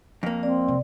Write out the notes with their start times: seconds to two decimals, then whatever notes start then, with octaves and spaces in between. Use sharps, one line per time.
0.23 F2 A#3
0.43 C4 D5
0.68 C3